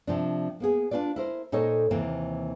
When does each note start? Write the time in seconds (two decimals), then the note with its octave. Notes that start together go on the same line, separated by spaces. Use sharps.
0.07 C3 F3 D4
0.60 A#3 B3 G#4
0.91 D4 D#4 F4 B4 D5
1.16 E4 A#4 C5
1.52 A#2 D#4 A4 C5 C#5 D#5
1.91 D#2 C3 E3 A#3